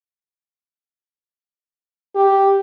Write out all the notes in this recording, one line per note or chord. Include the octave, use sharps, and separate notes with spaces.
G4